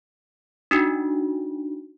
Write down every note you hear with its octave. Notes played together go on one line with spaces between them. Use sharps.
D4 D#4 F#4